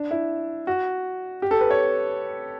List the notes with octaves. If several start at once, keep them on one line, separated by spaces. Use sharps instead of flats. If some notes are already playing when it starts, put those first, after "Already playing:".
Already playing: D4
E4
F#4
G4
A4
B4
C#5